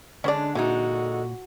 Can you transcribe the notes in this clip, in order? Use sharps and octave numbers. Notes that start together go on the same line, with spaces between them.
D3 G#3 C#4 D4 C5 D5
A#2 D3 E3 G#3 D#4 F#4